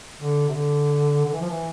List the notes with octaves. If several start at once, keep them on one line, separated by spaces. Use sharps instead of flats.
D3
C3
D3
D3
E3
F3
E3